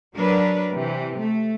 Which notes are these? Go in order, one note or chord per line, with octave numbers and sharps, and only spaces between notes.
F#3 D4 A#4 B4
C3 E3
A3